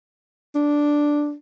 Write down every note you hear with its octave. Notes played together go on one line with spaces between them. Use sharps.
D4